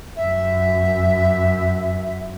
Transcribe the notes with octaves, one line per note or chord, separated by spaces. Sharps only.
F#2 E5